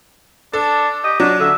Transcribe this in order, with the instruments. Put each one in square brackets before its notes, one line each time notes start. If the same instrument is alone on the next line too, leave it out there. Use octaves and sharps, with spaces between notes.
[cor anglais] D4 [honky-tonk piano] A4
[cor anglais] G4 [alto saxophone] D#5
[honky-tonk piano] F#3 [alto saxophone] D4
[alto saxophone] D3 [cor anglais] E5